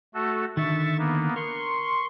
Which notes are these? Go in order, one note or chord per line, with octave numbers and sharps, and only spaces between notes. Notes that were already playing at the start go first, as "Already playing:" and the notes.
A3 F#4 A4
D3 D#3 E5 C#6 A6
A#3 B3
A#4 C6 C#6